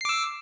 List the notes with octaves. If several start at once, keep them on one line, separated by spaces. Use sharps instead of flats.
D6 E6 C7